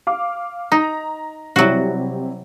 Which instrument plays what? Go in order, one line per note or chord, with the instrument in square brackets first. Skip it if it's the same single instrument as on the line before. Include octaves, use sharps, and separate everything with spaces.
[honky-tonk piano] F5 D6
[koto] D#4 [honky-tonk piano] A#5
[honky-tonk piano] C3 G3 E4 [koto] F#3 F#4